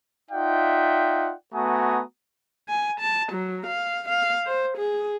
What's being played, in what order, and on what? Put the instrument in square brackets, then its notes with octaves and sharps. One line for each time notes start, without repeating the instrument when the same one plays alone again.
[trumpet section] D#4 F4 D5 E5 F#5 G5
A3 B3 F#4 G#5 A#5 D#6
[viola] G#5
A5
F#3
F5
F5
C5
G#4